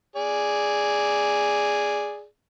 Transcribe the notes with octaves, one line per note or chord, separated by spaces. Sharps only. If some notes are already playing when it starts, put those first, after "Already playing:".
G#4 D5